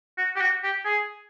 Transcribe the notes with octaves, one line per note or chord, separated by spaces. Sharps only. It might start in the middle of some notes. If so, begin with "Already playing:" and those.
F#4
G4
F#4
G4
G#4